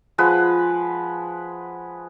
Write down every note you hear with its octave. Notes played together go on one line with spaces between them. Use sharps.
F3 G#3 B4 F#5